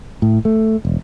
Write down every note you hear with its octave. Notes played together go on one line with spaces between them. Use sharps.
A2
A3
E1